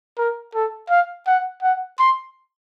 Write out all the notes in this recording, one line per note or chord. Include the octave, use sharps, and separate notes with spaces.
A#4
A4
F5
F#5
F#5
C6